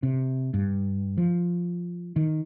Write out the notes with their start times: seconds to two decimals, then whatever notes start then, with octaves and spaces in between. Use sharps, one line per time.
0.03 C3
0.54 G2
1.17 F3
2.16 D#3